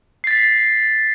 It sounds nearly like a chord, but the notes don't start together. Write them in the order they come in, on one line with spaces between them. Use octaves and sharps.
C7 A6 B6